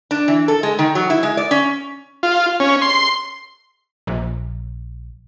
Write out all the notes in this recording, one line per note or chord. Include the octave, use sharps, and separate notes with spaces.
D4
E3
A4
G#3
D#3
F#3
E4
G#3
D5
C#4
F4
C#4
C6
A#1